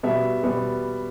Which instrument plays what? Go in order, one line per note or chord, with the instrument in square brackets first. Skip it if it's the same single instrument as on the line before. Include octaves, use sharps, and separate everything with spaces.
[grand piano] B2 G3 B3 E5
B2 G3 B3